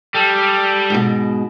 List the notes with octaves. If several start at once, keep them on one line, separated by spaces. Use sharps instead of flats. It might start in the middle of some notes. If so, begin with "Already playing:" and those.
G3 A4
G#2 B2